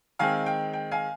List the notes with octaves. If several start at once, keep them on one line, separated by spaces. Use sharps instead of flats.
D#3 G#3 C4 F5 G#5
G5
G5
F5 G#5